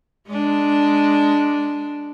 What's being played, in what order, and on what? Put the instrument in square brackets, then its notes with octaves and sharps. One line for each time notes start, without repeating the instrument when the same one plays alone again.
[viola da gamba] G#3 D4